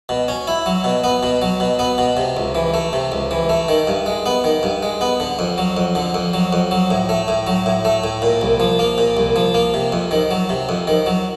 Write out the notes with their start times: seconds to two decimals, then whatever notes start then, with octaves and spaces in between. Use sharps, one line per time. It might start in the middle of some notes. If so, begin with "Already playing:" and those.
0.09 B2
0.28 C#4
0.47 E4
0.66 F#3
0.84 B2
1.04 B3
1.23 B2
1.42 F#3
1.60 B2
1.79 B3
1.98 B2
2.17 C3
2.37 C#2
2.55 E3
2.74 A3
2.93 C3
3.12 C#2
3.31 E3
3.49 A3
3.68 D#3
3.87 G2
4.06 G#3
4.26 B3
4.44 D#3
4.63 G2
4.83 G#3
5.01 B3
5.20 D3
5.39 F2
5.58 F#3
5.77 F2
5.95 D3
6.14 F2
6.34 F#3
6.53 F2
6.71 F#3
6.90 A2
7.09 A3
7.28 A2
7.47 F#3
7.66 A2
7.85 A3
8.04 A2
8.22 A#2
8.41 C2
8.60 F3
8.79 A#3
8.98 A#2
9.17 C2
9.36 F3
9.54 A#3
9.74 C3
9.92 F2
10.11 D#3
10.31 F#3
10.49 C3
10.69 F2
10.87 D#3
11.06 F#3